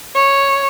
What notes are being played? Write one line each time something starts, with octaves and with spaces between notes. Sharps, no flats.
C#5